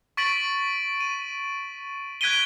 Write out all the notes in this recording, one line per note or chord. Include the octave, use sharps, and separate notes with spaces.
C#6 A6 B6 D7 F#7
D#7
F#6 G#6 B6 D7 D#7 G7